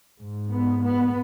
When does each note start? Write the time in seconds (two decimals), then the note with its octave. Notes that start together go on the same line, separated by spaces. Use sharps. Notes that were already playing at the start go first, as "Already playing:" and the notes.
0.19 G#2
0.50 B3
0.83 B3